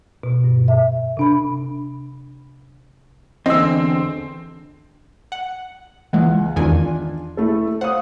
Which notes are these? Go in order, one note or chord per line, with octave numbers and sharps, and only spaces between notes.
B2
G2
E5
C3 D4 B5
E2 D3 C4 D#5 E6
F#5
C#2 E3 G#3 F#5
E2 D#3 D4 F4 G#5
A3 E4 A4
C5 F5 F#5 D#6